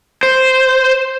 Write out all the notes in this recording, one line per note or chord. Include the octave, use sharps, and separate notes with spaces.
C5